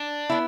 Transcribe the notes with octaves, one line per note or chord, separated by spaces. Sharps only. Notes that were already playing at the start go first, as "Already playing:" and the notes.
Already playing: D4
B3 E4